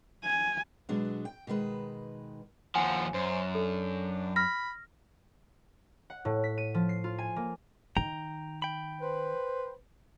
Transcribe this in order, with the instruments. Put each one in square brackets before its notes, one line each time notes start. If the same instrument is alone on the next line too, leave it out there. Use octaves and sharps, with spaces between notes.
[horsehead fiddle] G#5
[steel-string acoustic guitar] B2 F#3 G#3 B3 D4
G5
B2 D#3 G#3 B4
[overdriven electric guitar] D#2 F3 [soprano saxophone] F#5 [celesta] G#5
[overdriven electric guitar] F#2 [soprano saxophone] C5
[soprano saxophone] D4 [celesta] A4
[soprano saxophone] B5 [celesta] F6 A#6
[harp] F#5
A2
B6
D#7
F3
C7
F4
G#5
A#3
[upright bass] D#3 [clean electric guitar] G5 A#5
[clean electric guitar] G5 B5
[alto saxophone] B4 [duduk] C5